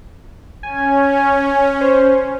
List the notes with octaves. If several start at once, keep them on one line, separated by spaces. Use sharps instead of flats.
C#4 G#5
C5